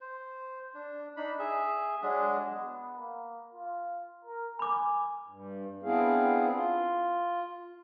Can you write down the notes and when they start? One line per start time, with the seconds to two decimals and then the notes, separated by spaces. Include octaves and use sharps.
0.01 C5
0.74 D4
1.17 D4 D#4 B5
1.39 G#4 E5
2.02 F#3 G#3 D4 G#4
2.56 B3
2.98 A#3
3.54 F4
4.25 A#4
4.59 G#5 B5 D6
5.28 G2
5.83 B3 C4 D4 E4 G#4 F5
6.53 F4